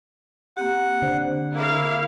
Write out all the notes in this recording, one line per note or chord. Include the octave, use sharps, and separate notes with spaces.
A#3 C4 G4 F#5
D3 C5
A#3 E4 F5